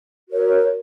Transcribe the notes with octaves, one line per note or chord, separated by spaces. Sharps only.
F#4 A#4 C#5